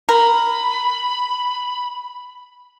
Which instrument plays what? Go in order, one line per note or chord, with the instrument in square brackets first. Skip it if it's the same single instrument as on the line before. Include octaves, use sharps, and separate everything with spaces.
[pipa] A#4 [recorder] B5